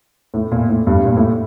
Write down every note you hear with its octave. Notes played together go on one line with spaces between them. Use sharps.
A2
A#2
A2
G2
A#2
A2